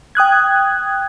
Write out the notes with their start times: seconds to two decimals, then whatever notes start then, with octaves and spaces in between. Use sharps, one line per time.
0.15 G5 D#6 F#6 G#6